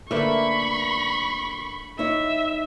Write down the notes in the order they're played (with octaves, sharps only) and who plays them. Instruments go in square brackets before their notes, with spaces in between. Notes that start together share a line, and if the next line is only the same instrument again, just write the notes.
[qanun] D3 A3 A#3 [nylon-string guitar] B4 E5 [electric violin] B5 C#6
[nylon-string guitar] D#4 E4 C#5 [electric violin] E5